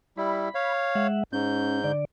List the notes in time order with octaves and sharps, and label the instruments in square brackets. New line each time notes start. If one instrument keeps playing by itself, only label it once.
[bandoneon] G3 E4 [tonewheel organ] B5
[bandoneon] C#5 F5
[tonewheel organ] G#3 E5 F#5
[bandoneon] G#2 G6 [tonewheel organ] C#4
[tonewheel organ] D3 D5